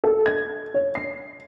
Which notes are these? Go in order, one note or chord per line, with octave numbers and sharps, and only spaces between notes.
A4
G#6
C#5
C7